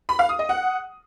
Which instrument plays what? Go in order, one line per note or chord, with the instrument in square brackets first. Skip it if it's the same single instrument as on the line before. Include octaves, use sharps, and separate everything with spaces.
[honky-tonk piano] B5
F5
D#6
D#5
F#5